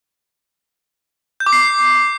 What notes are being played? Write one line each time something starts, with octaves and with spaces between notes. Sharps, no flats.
G6
D6
C7